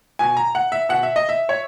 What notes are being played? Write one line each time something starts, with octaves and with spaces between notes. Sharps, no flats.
B2 G#5
A#5
F#5
E5
B2 F#5
E5
D#5
E5
C#5